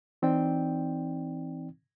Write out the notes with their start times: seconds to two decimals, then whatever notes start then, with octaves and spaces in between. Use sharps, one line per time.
0.22 E3 C4 D#4 D5 G5